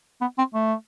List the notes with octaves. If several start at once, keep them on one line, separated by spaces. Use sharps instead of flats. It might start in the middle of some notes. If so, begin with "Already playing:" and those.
B3
C4
A3